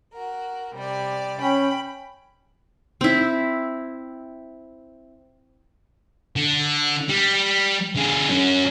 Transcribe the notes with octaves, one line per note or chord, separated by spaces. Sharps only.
F#4 A#4
C3 G3 D5
C#4 G5 B5
C4 E4
D3
G3
D3 G#4
F#3 C#4